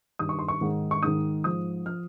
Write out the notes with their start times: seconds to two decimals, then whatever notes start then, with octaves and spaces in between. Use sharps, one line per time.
0.19 G2 D#3 D#6
0.29 C#6
0.39 C6
0.48 C#6
0.61 G#2 D#3
0.91 C#6
1.03 G#2 D#3 D#6
1.44 G#2 F3 D#6
1.86 F3 F6